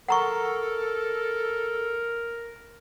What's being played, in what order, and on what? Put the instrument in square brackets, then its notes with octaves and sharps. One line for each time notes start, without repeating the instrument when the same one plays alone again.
[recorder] A4 [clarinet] A#4 [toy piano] F#5 A#5 C#6